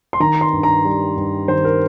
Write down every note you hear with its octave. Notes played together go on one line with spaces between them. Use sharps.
C6
D#3 A#5
C6
G2
A#5
G3
G2
D#3 C5
A#4